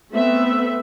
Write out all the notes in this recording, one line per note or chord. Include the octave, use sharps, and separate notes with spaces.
A3 B3 C4 B4 E5